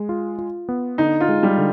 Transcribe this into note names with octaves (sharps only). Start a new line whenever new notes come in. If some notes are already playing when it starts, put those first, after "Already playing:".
Already playing: G#3
F4
F4
B3
D3 D#4
F4
G#3
G3
D3